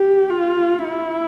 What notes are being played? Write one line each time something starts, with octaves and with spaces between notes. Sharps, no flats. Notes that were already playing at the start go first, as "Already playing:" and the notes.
Already playing: G4
F4
E4